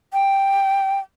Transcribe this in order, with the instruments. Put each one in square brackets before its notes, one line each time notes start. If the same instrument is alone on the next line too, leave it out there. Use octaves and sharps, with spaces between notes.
[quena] G5